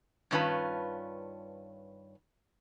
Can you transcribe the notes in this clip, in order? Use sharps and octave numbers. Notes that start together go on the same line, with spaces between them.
G2 D#3 C#4 F4 B4 A5